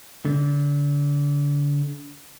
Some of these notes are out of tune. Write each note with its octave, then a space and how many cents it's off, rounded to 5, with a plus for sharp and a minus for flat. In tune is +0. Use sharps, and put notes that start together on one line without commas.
D3 -30